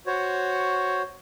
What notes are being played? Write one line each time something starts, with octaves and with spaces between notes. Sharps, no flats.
F#4 C5 C#5